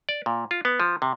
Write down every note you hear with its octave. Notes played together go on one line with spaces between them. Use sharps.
D5
A#2
F4
B3
F3
C3